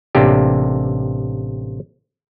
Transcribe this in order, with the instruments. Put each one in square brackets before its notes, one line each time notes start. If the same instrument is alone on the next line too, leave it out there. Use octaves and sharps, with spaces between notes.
[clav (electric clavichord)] A1 C3 A#3 D4 G4